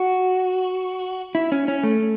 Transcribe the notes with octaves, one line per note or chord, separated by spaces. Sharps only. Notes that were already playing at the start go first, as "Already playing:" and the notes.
Already playing: F#4
E4
C#4
C#4
A3